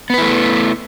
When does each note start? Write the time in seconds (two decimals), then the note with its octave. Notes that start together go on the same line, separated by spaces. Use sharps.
0.10 B3
0.14 B4
0.18 E4
0.22 A3